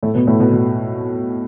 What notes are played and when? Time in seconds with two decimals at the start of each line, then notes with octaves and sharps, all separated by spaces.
0.03 A2 A3
0.15 B2 B3
0.27 A2 A3
0.40 B2 B3
0.52 B2 B3